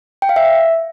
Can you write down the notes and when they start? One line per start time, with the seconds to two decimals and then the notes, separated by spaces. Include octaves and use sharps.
0.22 G5
0.29 F5
0.36 E5